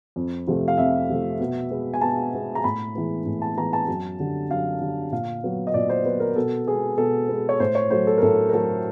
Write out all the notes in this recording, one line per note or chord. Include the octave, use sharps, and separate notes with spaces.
F2
C3 F3 A3
F5
F2 E5
C3 F3 A3
B2
G#3 B3
G#5
B2 A5
G#3 B3
A#5
A2 B5
E3 G#3 B3
A2
A5
E3 G#3 B3 A#5
A5
F#2
D3 G3
F#2 F5
D3 G3
A#2 F5
F#3 B3
D#5
A#2 D5
C5
F#3 B3 B4
A#4
B2 A4
G#3 B3 G#4
B2 A4
G#3 B3
C#5
A2 C5
C#5
F#3 A3 C5
A4
A#4
A2 A4
A#4
F#3 A3 A4